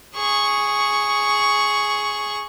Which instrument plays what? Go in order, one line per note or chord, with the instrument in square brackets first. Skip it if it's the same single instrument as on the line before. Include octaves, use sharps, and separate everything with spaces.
[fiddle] G#4 C#6